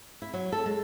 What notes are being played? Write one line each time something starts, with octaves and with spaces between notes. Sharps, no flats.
E4
F#3
A4
G#3